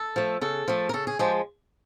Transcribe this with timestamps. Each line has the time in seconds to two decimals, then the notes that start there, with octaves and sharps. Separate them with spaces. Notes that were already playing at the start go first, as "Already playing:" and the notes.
Already playing: A4
0.16 F3 A3
0.41 C#3 A4
0.68 F3 A3
0.89 A#4
0.93 C#3 A4
1.07 G#4
1.19 F3 G#3 G4